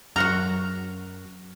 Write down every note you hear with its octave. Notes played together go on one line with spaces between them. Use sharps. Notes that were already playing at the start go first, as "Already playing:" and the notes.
F#2 F#3 F#4 F#5 A#5 F6